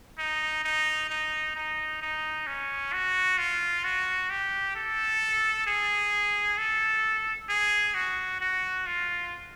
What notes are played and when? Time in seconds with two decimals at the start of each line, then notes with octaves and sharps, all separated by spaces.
0.18 D#4
0.64 D#4
1.10 D#4
1.55 D#4
2.02 D#4
2.47 C#4
2.93 F#4
3.38 F4
3.84 F#4
4.30 G4
4.76 A4
5.67 G#4
6.58 A4
7.49 G#4
7.95 F#4
8.41 F#4
8.86 F4